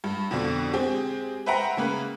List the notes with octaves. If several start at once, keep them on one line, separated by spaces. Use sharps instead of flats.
G2
F2 B2 D3
G#3 C4 G4 G#4
B4 C5 E5 F#5 G5 A#5
C#3 A#3 B4